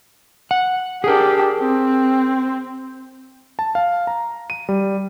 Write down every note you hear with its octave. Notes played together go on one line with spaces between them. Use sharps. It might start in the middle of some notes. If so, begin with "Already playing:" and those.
F#5
D4 G4 G#4 A#4
C4
A5
F5
A#5
D#7
G3